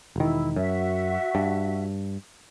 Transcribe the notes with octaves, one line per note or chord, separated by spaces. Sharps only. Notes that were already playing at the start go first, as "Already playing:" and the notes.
E1 D#3 E4
F#2 F#4 E5
G2